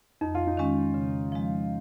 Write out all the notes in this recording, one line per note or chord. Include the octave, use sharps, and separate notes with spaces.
F2 D#4
F4
D#4
D#3 G#3 C#4
C#3
F3 G#3